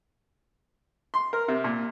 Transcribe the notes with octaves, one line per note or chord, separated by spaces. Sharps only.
C6
A#4
C3
A#2